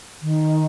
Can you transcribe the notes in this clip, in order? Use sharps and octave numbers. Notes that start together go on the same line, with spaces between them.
D#3